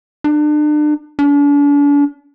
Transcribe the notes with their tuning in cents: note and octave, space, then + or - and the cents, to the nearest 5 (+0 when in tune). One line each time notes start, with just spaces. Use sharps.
D4 +35
D4 -40